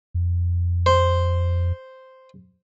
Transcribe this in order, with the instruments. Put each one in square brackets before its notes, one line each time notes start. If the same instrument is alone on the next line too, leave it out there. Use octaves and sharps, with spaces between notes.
[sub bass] F2
[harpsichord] C5